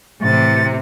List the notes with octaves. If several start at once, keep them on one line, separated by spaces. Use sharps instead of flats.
A2 C3 E3 A6